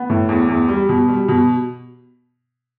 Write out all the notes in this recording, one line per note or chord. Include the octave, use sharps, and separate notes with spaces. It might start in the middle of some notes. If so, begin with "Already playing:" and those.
Already playing: B3
A2
E2
E2
G3
B2
G3
B2